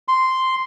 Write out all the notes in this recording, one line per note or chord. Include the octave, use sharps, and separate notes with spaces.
C6